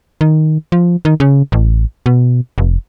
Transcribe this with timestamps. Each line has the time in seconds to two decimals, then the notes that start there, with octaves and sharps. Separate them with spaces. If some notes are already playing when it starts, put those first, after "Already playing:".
0.21 D#3
0.72 F3
1.05 D#3
1.20 C#3
1.52 A1
2.06 B2
2.58 F1